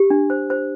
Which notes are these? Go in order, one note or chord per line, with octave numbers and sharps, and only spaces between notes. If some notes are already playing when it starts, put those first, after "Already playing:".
Already playing: G4
D4
C5
C5